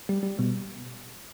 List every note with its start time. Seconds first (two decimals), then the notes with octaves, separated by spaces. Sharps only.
0.09 G3
0.23 G3
0.39 B2